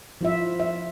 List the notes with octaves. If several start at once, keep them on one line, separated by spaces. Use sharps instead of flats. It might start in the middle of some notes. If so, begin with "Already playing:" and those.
F3 F4 E5
E5